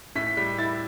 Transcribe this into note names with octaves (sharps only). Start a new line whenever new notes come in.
A2 B6
B6
G3 B6
E4 A6